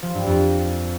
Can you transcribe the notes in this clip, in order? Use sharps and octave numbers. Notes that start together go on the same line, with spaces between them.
F3
G2
F2